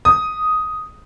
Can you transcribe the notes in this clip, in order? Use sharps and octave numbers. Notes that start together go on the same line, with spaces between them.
D#6